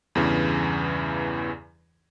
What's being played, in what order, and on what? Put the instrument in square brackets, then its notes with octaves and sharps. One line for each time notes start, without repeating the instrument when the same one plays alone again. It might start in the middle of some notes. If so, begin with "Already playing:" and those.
[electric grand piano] E2 G2 C#3 E3